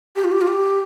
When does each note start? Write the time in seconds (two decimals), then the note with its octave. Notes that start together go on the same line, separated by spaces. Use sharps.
0.16 G4
0.24 F4
0.32 G4
0.41 F4
0.47 G4